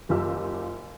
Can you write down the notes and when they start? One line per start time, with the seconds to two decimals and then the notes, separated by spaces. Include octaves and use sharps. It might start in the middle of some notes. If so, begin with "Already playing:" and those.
0.09 F#1 F#2 F4 G4 E6